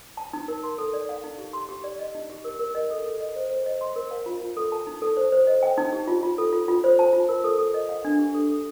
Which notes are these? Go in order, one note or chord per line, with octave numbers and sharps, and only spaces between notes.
A5
D#4
A#4
C6
A4
D5
F5
D#4
G4
C6
G4
D5
D#5
D#4
G4
A#4
A#4
D#5
A4
A4
D#5
C5
C5
D#5
C6
A#4
F5
F4
F4
A4
A5
D#4
A4
C5
C5
D#5
G5
D#4
G4
F4
F4
A4
F4
F4
C5
A5
F4
A#4
A4
A4
D#5
F5
D4
G4
A4
A4